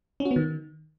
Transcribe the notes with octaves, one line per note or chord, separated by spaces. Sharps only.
C#4
F#4
B3
D#3